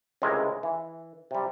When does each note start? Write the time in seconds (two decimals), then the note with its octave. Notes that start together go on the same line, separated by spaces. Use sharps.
0.22 C#2 A2 C3 G#3 E4 A#4
0.63 E3
1.31 C3 G3